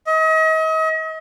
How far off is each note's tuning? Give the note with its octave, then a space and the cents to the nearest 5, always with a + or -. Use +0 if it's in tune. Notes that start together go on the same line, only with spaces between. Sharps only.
D#5 +40